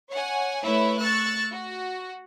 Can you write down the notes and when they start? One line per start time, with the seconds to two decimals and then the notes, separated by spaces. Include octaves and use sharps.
0.10 C#5 F#5 G#5
0.62 A3 E4 B4 C#5 E5
1.00 C#6 E6 F#6 A6
1.50 F#4